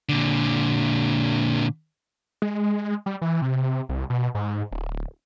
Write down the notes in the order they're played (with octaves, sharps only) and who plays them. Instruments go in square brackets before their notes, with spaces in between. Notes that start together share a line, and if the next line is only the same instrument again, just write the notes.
[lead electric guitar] A#2 D3
[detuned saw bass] G#3
G3
E3
C3
C2
B2
G#2
D1